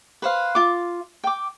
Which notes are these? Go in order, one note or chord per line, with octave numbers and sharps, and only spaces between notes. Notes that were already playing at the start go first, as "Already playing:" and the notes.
B4 C5 F5
F4 D6
G5 D6